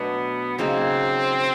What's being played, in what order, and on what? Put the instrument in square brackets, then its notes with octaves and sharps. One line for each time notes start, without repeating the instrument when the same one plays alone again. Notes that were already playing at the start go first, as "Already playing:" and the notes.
Already playing: [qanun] B2 F#3 A3 D4 [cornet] B3
[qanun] C#3 F#3 A#3 D#4 [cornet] C4